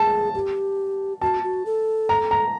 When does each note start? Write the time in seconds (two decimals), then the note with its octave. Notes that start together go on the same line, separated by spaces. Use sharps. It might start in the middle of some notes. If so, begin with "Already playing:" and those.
Already playing: G#4 A5
0.35 G4
1.22 F#4 A5
1.43 F#4
1.66 A4
2.09 A#5
2.31 A#5